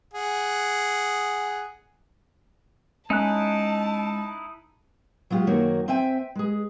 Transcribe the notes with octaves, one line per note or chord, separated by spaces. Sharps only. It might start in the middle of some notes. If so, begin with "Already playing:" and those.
G#4 F#5
G#3 C#4 D#4 E4 A5 F#6
F#3 G#3 F4 G4
F#2 D#3 A#3 F#4 C#5
C4 C5 E5 G5 G#5
G#3 G#4